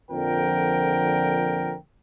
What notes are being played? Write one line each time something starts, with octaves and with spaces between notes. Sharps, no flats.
F2 A#2 D3 F3 A#4 G5